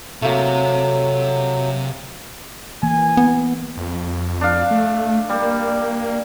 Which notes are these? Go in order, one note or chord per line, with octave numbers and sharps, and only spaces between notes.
C3 F#3 A3 A#3
E3 A#3 G#5
B3
F2
D4 F5
A3
G3 A#3